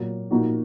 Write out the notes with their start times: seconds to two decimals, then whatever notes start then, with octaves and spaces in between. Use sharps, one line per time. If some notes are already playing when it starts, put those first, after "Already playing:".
Already playing: A#2 F#3 A#3
0.31 A#2 F3 A#3 D#4 F#4